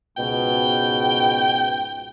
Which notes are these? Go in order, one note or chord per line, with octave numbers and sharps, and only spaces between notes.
C#2 G#2 B2 G5